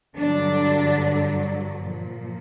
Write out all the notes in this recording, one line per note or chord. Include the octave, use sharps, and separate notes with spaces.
G2 D3 F#3 D4
A#2 F3